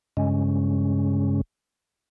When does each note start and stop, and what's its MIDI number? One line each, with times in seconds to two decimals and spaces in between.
0.17 1.41 43
0.17 1.41 49
0.17 1.41 56
0.17 1.41 61